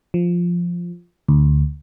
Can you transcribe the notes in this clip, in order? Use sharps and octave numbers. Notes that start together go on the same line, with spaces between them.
F3
D2